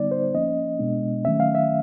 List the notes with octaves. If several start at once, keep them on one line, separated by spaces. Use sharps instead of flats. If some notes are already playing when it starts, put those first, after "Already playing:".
Already playing: D3 G3 B3 D#4 D5
C5
F3 A#3 C#4 D#5
B2 G#3 B3 D4
D#3 F#3 A3 C#4 E5
F5
E5